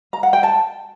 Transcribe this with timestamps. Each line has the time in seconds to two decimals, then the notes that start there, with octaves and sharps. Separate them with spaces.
0.13 A#5
0.23 F#5
0.33 G5
0.43 A5